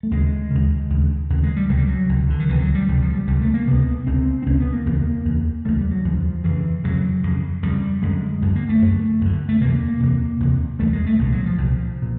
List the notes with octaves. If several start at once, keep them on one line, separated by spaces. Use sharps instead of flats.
A3
D#2 C#3 G#3
D#2 C#3
D#2 C#3
D#2 C#3
G#3
G3
C#2 C3 F#3
G3
F#3
C#2 C3
D3
D#3
C#2 C3 E3
F#3
G3
C#2 C3 F3
F3
G3
C#2 C3 G3
A3
A#3
C#2 C3 B3
C#2 C3 C4
C4
C#2 C3 C#4
B3
A#3
E2 C#3 A#3
E2 C#3
E2 C#3 A3
G3
F#3
E2 C#3 F3
F2 C#3 E3
F2 C#3 F#3
F2 C#3
F2 C#3 G3
F#2 D3 G#3
F#2 D3
A#3
A3
F#2 D3
F#2 D3
A3
E2 C3 A#3
E2 C3
E2 C3
E2 C3 A3
G#3
A3
C2 A#2 G#3
F#3
F3
C2 A#2
A#2